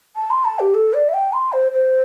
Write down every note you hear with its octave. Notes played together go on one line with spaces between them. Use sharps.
A5
C6
A5
G4
A4
D5
E5
G5
C6
C5
C5